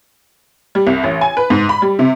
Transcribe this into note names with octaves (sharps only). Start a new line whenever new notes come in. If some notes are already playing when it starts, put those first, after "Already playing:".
G3
C2
A1
G#5
B4
G#2
B5
G3
C3